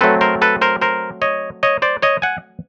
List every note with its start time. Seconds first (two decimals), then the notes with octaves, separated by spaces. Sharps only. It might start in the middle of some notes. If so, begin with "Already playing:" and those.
0.01 F#3 A3 C4 A4 B4
0.21 A#4 C5
0.42 A4 B4
0.62 A#4 C5
0.81 A#4 C5
1.22 C#5 D#5
1.63 C#5 D#5
1.82 C5 D5
2.02 C#5 D#5
2.22 F#5 G#5